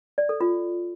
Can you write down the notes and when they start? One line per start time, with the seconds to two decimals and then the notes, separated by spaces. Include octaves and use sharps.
0.18 D5
0.29 A4
0.41 F4